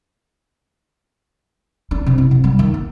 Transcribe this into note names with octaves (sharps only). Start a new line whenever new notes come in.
D4
C3
E4
C3
G3
D#3
A#3